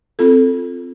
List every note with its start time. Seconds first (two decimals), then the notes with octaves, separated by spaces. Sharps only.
0.19 C4 F4 A4